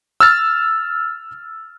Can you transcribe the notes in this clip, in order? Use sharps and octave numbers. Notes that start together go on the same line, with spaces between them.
E6 F6 A6